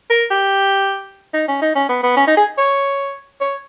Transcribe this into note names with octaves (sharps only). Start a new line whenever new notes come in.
A#4
G4
D#4
C#4
D#4
C#4
B3
B3
C#4
D#4
G#4
C#5
C#5